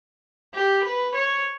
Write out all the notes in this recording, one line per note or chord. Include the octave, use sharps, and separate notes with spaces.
G4
B4
C#5